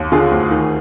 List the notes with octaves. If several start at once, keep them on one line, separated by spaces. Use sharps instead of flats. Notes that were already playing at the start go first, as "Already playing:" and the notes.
Already playing: D#2
D3 F4 G#4
D2
D#3